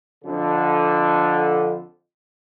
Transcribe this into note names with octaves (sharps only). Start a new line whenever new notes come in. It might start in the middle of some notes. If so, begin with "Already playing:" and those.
F2 D3